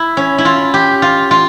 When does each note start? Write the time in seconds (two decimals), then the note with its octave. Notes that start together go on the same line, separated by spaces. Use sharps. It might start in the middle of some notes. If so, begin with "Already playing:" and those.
Already playing: E4
0.17 C#4
0.38 E4
0.45 F4
0.74 G4
1.02 F4
1.31 F4